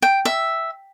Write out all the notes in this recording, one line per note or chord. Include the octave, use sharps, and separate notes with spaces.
G5
E5